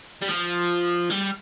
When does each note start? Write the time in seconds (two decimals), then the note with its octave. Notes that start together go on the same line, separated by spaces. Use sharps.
0.22 G3
0.28 F3
1.10 G3